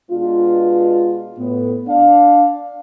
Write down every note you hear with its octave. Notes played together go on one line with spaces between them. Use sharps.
B2 G#3 B3 D4 F4
A2 B3
D4 F5